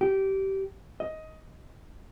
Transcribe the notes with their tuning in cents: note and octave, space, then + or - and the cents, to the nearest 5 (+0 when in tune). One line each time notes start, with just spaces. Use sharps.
G4 -20
D#5 +15